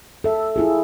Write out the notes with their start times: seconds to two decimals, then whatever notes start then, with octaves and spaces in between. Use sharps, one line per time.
0.24 A4 E5
0.56 E4 F4 G#4